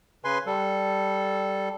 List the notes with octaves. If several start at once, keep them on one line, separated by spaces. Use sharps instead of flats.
C#3 B4 G#5 C6
G3 A4